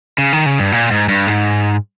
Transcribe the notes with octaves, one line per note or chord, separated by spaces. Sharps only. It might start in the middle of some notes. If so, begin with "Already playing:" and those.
C#3
D#3
C#3
G2
A#2
G#2
G2
G#2